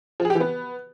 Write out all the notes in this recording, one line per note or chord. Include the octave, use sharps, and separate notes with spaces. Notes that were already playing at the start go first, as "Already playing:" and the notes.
F3
G#4
G4
E3
B3